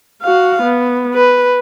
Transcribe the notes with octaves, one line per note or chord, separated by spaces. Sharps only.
F#4 F5
B3
B4